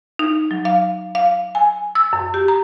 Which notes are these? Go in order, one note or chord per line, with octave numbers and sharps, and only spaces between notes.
D#4
F#3
F5
F5
G#5
E6
F#2
G4
A#5